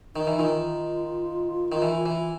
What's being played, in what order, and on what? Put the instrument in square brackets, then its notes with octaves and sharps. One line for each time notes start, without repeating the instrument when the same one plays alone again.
[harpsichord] D#3 [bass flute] D#4
[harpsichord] E3
[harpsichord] D#3 [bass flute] F4
[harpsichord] D#3
E3
E3